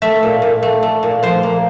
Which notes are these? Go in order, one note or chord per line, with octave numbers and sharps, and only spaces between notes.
A3 E5
A#2
A#2
A3
A3
A#2
F3 C5
A#3